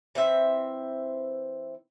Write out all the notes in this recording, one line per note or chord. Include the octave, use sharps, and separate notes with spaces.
E3 C4 E5